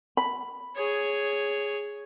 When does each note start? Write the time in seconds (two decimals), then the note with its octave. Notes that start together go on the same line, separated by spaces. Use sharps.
0.17 B5
0.76 G#4 C#5